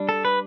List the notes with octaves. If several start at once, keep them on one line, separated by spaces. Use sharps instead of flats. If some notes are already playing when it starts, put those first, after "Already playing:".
Already playing: G3 D4
A4
B4